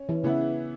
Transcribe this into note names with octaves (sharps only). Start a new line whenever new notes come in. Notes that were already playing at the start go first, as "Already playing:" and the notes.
Already playing: C#4
E3
C#3 E3 B3 E4